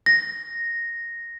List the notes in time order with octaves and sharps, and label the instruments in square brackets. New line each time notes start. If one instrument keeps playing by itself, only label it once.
[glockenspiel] A#6